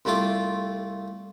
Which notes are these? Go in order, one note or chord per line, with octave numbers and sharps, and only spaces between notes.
C2 G3 A3 F4 D6